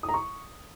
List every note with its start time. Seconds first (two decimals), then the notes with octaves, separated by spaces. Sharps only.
0.03 D#6
0.09 A#5
0.14 C#6